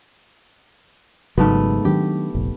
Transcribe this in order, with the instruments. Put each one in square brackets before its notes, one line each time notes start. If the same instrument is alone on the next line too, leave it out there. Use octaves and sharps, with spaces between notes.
[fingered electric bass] G#1 C#3 F#3 [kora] G#2 A3 B3
[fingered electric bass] D#3 F#3 D4 [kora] G4
[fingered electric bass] F1 A#1